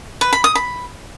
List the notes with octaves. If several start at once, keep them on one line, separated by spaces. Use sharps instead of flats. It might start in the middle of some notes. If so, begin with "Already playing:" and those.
B4
B5
D#6
B5